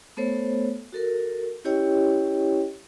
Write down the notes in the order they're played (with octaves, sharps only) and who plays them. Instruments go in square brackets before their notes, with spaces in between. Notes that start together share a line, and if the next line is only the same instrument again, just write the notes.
[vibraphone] A3 B3 A4 C5 C#5
F#4 A4 A#4
C#4 E4 G4 C#5 D#5 G5